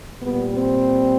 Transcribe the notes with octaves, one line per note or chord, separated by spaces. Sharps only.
A#2 G3 B3
C4